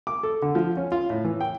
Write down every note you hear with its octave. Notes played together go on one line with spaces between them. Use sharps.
D6
A4
D3
F3
C#4
F4
A2
E3
G5